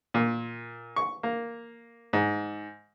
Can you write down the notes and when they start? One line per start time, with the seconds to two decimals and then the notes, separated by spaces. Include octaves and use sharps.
0.14 A#2
0.96 C#6
1.23 A#3
2.13 G#2